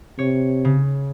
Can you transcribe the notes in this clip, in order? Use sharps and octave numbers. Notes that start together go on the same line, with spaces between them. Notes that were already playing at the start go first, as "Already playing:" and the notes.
C3 C#5
C#3